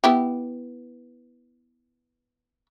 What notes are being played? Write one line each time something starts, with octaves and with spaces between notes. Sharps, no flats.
B3 E4 G4